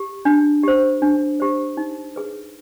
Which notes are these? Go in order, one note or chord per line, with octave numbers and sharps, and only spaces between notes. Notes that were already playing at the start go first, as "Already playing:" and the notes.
Already playing: G4
D4
G4 C5
D4
G4 C5
D#4
G#4 B4